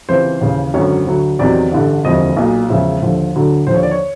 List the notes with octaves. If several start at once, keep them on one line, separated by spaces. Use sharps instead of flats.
C#2 C3 E3 C5
D#2 C#3 E3
G#1 F#2 D3 F#3 C#5
D2 D3 F#3
E2 C3 D#3 F#3 D5
A1 G2 D3
E1 D2 C3 F3 D#5
B1 A#2 F#3
E1 E2 C#3 F3 E5
D#2 D3 F3
D2 D3 F#3
D#2 D3 F3 C5
C#5
D5
C#5